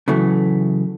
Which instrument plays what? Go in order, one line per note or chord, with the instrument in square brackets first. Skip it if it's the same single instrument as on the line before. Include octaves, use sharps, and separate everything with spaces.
[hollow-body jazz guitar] C#3 E3 F#3 A3